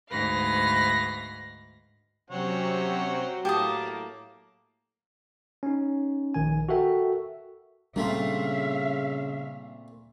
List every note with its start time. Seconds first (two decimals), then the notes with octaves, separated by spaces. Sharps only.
0.10 D2 G#2 D#4 B4 F5 A#6
2.30 C3 F#3 C4 C#4 C#5 F#5
3.45 A2 A#3 G4 A5 D6 D#6
5.63 C#4 D#4
6.34 A#1 D#3 G#5
6.69 F#4 A4 A#4 E5 G5
7.96 A#2 C#3 G3 A3 C4 D4 E5 F5